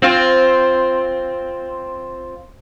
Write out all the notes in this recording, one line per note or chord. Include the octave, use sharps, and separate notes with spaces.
C4 F4